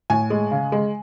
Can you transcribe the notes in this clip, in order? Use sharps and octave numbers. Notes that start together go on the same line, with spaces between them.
A2 G#5
G#3
C#3
G#3